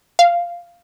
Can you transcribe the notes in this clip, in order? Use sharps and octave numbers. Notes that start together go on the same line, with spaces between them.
F5